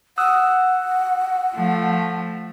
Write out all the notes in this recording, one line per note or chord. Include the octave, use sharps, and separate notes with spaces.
F#5 D#6 E6 F#6
F3 A3